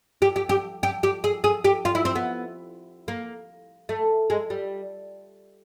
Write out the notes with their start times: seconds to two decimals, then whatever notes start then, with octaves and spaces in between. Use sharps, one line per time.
0.22 G4
0.36 G4
0.49 G4
0.83 G4
1.03 G4
1.24 G#4
1.44 G#4
1.64 G4
1.85 F4
1.95 E4
2.05 C4
2.15 B3
3.08 A#3
3.89 A3
4.30 G#3
4.50 G3